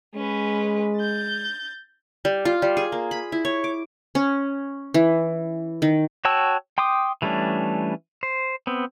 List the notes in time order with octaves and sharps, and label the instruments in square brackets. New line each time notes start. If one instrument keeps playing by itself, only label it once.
[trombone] G#3 [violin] C#4 B4
[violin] G6 A6
[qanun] G3
F4
G3
G#4
A#3
B5
E4
C#5
D6
C#4
E3
D#3
[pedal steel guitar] F#4 C#5 G5 A5 E6
G5 C6 D6 D#6
E3 G3 A3 C#4 D4
C5
B3 C4